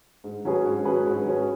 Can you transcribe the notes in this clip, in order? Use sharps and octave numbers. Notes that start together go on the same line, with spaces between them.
G#2
F#3 C#4 G#4 B4
G#2
F#3 C#4 G#4 B4
G#2
F#3 C#4 G#4 B4